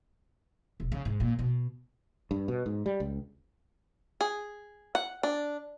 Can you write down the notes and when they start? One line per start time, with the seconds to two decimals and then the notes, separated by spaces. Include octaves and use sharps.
0.80 E1
0.92 C#3
1.05 G#2
1.20 A#2
1.39 B2
2.31 G2
2.48 B2
2.66 G#2
2.86 G3
3.00 C#2
4.21 G#4
4.95 F#5
5.23 D4